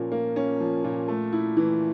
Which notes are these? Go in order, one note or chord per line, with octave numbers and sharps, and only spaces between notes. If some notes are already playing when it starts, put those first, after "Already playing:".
Already playing: A#2 F3 A#3 C#4
A#3
C#4
F3
A#2
A3
E4
E3